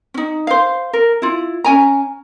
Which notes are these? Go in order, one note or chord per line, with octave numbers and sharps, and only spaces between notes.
C#4 D#4
C5 F5
A#4
E4 F4
C#4 G#5 A#5